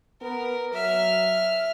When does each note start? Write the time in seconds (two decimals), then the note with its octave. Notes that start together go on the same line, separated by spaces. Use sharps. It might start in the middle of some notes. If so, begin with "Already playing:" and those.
0.21 B3 A#4
0.73 F#3 E5 F6